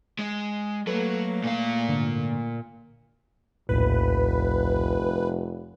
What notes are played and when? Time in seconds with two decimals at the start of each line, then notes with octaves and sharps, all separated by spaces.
0.19 G#3
0.87 F#3 A3 A#3 A4 B4
1.44 A#2 F5
1.88 G#2 D3
3.69 F1 A#1 D#2 A2 B4